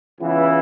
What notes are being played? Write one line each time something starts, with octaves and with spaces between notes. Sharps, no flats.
C#2 C#3 E3 B3 E4